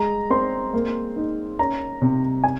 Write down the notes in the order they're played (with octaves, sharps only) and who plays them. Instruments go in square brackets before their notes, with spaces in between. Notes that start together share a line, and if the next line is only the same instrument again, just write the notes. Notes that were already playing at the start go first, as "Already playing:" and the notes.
Already playing: [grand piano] G#3 A#5
C4 C6
A#3
D#4
C#4 A#5
C3
G#5